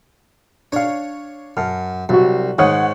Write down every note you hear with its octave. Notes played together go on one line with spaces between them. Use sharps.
D4 C#5 F5
F#2 A5 F6
C2 F#3 F#4
G#2 D#3 C#5 F#5 D#6